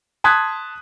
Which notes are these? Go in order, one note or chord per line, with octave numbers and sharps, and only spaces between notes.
A5 C6 D#6 F#6 G#6 B6